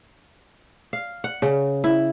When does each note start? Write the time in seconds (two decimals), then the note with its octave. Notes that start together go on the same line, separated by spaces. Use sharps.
0.93 F5
1.24 F#5
1.42 C#3
1.84 E4